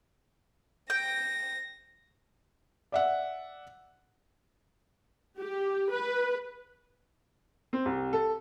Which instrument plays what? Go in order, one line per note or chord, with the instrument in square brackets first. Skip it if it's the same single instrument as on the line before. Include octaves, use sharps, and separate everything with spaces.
[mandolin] G5 [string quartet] A#6
[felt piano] D5 E5 F#5
[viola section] G4
B4
[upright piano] C4
C2
A4